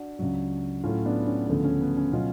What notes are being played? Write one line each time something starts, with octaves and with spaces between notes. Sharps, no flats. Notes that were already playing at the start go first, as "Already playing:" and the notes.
Already playing: D4 F#4
C#2 C#3 F#3
A2 F#3 A3 C#4 F4
B3 D4
C#4
D2 C#3 F3 A3 B3
C#4
B3
C#4
B2 F#3 C#4 F4